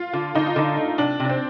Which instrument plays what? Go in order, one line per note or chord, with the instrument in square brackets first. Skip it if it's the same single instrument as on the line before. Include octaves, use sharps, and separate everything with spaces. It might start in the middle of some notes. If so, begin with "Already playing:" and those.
Already playing: [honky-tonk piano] F4
[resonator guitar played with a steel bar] D3 [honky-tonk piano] F4
[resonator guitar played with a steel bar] D3 [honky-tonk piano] D#4
[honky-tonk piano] F4
[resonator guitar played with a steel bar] D3 [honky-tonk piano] D#4
[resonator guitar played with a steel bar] A3
[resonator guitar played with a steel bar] C3 [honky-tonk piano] D4
[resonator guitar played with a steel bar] C3
[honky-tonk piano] D4
C4